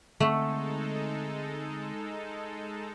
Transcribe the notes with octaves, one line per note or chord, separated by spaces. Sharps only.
D3 G#3 A3 C4 D#4 A4 F#5